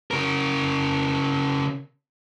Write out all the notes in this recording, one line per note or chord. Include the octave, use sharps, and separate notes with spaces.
C#3 A#4